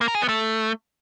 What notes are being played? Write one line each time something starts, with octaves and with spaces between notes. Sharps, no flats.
A#3
A#4
G#4
B3
A3